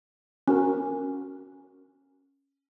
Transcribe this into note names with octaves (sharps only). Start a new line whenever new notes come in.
C#4 F#4 A#4